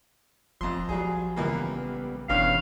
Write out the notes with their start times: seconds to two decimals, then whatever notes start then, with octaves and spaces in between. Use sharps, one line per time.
0.61 F1 F2 F3 C6
0.89 A#1 F#3 G3 G#4
1.36 C#2 E3 G3 A#3 B3
2.29 F#1 G2 B2 E3 C#4 G4 F5